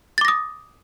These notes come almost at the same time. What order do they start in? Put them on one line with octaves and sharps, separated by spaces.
A6 D6 A#6 D#6